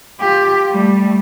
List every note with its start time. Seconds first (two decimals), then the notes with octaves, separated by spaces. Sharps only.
0.20 F4 G4
0.71 G3 A3